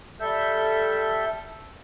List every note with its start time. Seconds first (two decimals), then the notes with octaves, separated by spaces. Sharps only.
0.20 G3 A4 E5 G6